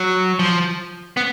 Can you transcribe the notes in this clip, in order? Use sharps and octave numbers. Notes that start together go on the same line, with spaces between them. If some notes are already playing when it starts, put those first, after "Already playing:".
Already playing: F#3
F3
B3